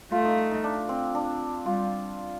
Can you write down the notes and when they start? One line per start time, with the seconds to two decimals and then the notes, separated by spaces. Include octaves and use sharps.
0.12 A3 F4
0.25 D#4
0.51 D#4
0.64 D4
0.89 C4
1.15 D4
1.65 G3 F4